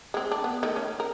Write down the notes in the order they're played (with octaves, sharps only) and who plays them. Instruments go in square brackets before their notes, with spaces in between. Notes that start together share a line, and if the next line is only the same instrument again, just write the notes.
[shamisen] G#3 C4
D4
B3
D#3 A3
C#4
A#4